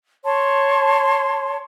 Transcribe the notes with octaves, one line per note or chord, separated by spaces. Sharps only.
C#5 A5 C6